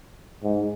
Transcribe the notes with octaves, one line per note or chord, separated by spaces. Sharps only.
G#2